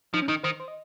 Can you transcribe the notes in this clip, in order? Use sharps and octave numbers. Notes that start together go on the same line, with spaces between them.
F3 D#4
C#4
D#3 D#4
D#3 C5
C5
D#5